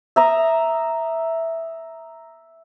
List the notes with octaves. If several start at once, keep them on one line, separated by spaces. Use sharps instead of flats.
E5 A#5 D#6